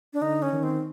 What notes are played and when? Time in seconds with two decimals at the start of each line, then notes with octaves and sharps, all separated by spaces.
0.13 D4
0.22 D3 D#4
0.42 C#4
0.53 D#3
0.63 C4